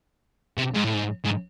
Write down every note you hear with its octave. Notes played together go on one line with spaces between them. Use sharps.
C3
G#2
A2
G#2
G#2